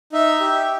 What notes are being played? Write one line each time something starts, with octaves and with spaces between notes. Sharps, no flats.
D#4 E5
G4